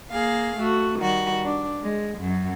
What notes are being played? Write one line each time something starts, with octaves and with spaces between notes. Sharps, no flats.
A#3 G#4 F5
A3 F#4
D#3 G3 F#4
D4
G#3
F#2